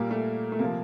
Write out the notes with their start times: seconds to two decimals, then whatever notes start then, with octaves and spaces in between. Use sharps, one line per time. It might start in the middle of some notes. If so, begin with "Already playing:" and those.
Already playing: A#2 G3 A#3
0.11 A3
0.52 A3
0.59 C3 F3 A#3